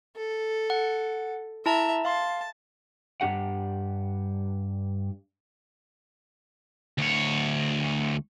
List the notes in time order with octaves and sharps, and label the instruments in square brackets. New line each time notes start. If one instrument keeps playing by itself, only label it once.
[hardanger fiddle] A4
[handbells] F#5
[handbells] E4 A5 A#5 [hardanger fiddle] E5
[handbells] F5 C6 [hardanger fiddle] A5
[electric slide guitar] G2 D4 G4 F#5
[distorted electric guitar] D2 C#5